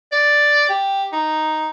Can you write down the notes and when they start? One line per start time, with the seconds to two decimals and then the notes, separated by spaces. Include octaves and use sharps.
0.12 D5
0.70 G4
1.13 D#4